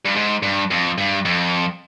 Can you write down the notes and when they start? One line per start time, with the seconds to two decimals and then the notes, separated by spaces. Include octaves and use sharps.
0.06 G2
0.16 G#2
0.43 G2
0.71 F2
0.98 G2
1.25 F2